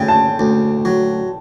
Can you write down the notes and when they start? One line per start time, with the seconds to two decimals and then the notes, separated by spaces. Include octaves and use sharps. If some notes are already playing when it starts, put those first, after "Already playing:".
Already playing: D2 C#3 G5
0.08 A5
0.39 D2
0.85 F#3